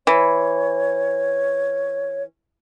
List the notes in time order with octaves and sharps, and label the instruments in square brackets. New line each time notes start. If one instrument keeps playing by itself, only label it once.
[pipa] E3 [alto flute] C#5